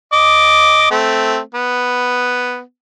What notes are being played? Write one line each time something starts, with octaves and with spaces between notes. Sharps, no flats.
D#5 D6
A3 C4
B3